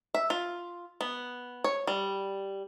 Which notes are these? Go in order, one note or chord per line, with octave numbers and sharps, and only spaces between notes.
E5
F4
B3
C#5
G3